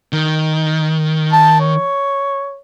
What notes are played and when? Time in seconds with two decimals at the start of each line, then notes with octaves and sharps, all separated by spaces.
0.13 D#3
1.33 A5
1.60 C#5